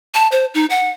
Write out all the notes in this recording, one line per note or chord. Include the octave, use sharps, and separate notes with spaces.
A5
C5
D#4
F#5